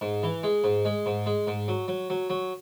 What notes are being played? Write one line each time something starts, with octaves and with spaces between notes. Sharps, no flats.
G#2
E3
G#3
G#2
G#3
G#2
G#3
G#2
F#3
F#3
F#3
F#3